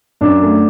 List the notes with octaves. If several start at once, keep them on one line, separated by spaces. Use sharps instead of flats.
F#2 D4
A3